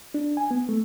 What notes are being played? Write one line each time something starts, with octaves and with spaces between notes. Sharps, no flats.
D4
G#5
B3
A3